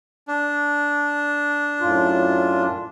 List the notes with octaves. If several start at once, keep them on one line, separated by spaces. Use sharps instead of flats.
D4
F#2 A2 F4